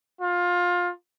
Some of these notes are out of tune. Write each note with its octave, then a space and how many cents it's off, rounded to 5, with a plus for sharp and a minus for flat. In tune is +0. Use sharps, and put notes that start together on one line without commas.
F4 +20